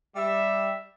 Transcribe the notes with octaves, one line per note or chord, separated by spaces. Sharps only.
G3 E5